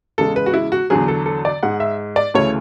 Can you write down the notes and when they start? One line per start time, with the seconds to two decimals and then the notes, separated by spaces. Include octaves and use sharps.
0.18 E2 C#3 G#3 A4
0.36 B4
0.46 F#4
0.54 E4
0.72 F#4
0.90 E2 D3 F#3 G#4
1.08 A4
1.26 A4
1.45 D5
1.63 G#2 G#3 F#5
1.80 E5
2.16 D5
2.34 D2 C#3 E3 A3 C#5